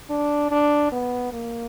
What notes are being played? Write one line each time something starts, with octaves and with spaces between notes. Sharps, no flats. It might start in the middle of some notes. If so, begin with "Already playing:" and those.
D4
D4
B3
A#3